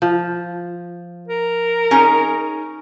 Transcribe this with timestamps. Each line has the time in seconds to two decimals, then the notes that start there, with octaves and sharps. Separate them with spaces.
0.02 F3
1.28 A#4
1.91 C#4 D#4 G#4